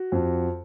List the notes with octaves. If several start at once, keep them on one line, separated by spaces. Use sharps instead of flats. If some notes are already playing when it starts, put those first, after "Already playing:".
Already playing: F#4
F2